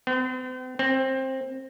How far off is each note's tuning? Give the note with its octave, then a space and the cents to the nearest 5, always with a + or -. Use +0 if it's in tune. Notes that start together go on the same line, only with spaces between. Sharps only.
C4 -45
C4 +15